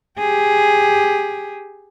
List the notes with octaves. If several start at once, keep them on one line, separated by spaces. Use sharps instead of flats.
G4 G#4